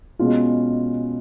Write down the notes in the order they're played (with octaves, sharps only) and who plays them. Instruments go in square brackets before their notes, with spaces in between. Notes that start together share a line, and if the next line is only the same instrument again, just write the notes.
[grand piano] B2 G#3 C#4 F4